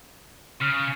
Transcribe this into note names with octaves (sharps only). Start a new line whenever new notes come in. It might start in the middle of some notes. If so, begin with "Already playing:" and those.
C#3 F6